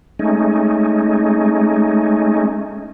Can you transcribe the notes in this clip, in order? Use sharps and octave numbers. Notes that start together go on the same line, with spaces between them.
G#3 A3 C#4 D#4